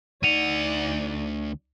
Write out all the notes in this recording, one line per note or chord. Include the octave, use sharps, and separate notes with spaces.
D2 D#4 D5 F#5 D#7 F7